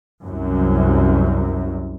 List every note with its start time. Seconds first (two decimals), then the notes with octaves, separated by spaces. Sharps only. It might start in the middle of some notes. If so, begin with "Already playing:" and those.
0.24 C2 F#2